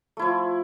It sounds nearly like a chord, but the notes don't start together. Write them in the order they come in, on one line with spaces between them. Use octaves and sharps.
A3 E4 F3